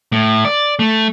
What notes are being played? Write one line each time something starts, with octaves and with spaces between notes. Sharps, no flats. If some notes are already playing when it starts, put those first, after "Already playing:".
A2
D5
A3